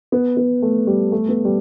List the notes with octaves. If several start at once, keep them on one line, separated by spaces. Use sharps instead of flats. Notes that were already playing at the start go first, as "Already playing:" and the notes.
B3
B3
A3
G3
A3
B3
G3